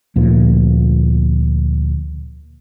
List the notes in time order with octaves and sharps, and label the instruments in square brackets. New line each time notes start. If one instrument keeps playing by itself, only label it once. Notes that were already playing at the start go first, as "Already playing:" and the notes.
[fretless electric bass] D2 A#2 F3